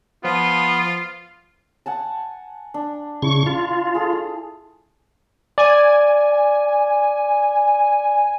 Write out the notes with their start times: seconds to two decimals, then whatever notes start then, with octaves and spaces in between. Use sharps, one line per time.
0.24 F3 B3 F4
1.86 F#5 G#5 A5
2.74 D4
3.22 C#3 E4 C#6
3.46 F4
3.95 G#4 A4
5.58 D5 G#5